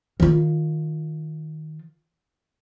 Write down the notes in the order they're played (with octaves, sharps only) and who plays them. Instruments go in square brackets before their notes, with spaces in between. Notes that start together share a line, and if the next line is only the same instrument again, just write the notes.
[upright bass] D#3 F4